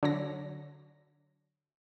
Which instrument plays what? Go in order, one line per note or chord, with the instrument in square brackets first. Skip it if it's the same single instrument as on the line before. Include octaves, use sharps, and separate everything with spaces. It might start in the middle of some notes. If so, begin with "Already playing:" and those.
[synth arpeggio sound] D3 F#3 C#5 A#6